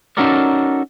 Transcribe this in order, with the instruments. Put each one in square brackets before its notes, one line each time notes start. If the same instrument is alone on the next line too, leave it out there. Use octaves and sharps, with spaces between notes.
[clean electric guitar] C#4 D#4 F#4 A4 A#4 D5